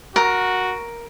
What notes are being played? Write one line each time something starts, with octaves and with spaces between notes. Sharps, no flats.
F#4 A#4